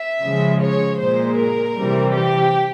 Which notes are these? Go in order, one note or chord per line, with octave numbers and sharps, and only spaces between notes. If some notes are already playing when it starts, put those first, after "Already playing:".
Already playing: E5
C#3 F3 G#3
C#5
A#2 G#3 C5
A#4
C3 E3 G3
G4